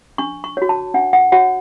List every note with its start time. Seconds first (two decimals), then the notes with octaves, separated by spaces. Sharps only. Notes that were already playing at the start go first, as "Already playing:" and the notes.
0.18 D4 C#6
0.44 C#6
0.57 F#4 C#5
0.69 A5
0.94 D4 F#5
1.13 F#5
1.32 F#4 C#5 F#5